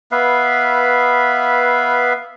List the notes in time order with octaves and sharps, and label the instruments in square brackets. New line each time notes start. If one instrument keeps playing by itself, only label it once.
[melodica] B3 B4 E5 F5